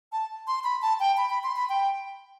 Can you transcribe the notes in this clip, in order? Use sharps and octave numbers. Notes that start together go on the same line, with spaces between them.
A5
C6
B5
A5
G5
B5
B5
C6
B5
G5